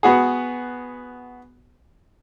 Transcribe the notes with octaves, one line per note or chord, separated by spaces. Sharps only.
B3 F#4 G#4